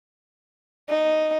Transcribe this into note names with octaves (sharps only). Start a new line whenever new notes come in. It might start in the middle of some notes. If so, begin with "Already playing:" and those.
D#4